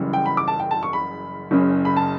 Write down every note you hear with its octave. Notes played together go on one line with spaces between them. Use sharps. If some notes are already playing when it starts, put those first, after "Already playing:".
Already playing: F#1 F#2 C#3 E3 G3
G5
B5
D6
A5
G5
A5
C#6
B5
F#1 F#2 C#3
B5
A5